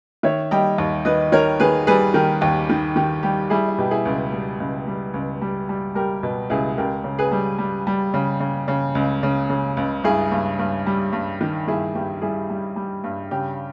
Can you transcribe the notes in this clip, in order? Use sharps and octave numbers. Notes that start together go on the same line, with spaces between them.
D#3 C#5 E5
G3 D#5 G5
D#2
D#3 B4 D#5
D#3 A#4 C#5
D#3 G#4 B4
G3 G#4 B4
D#3 G4 A#4
D#2 G4
D#3
D#3 G4
G3 G4
G3 E4 G#4
E4
B2 G4
E4 G#4
C#2
G3
C#2
G3
C#2
G3
G3
G3 G4 A#4
B2
C#2 E4 G#4
C#2 G4 A#4
C#3
G#4 B4
G3
G3
G3
C#3
C#3
C#3
C#2
C#3
C#3
C#2
G2 E4 G#4
G2
G2
G3
G2
D#3
G2 E4 G#4
G2 G4
G3 E4 G#4
G3
G3
G2
C#3 G4